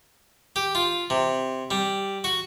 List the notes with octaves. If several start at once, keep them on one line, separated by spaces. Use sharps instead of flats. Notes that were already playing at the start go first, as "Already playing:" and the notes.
G4
F4
C3
G3
F#4